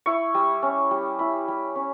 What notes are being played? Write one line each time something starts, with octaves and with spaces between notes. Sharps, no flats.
E4 C#6
G3
C#4
G3
E4 B5
G3
C#4